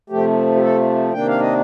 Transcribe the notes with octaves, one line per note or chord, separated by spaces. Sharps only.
C3 F3 A3 G4
G4
A4
C3 D#3 A#3 D4 G5
F5
D#5